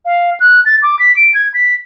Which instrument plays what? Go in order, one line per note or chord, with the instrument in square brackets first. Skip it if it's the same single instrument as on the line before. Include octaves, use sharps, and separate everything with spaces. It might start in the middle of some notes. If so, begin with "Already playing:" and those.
[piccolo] F5
F#6
A6
D6
B6
D7
G#6
B6